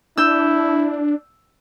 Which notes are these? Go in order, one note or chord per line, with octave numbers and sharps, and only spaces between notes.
D4 E4 E6 G6